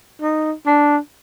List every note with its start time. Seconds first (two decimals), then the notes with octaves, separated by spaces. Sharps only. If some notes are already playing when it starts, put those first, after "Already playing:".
0.22 D#4
0.66 D4